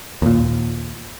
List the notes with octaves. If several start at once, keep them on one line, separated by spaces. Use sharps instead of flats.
D#2 A#2